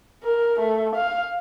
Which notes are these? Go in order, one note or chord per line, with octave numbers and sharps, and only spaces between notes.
A#4
A3
F5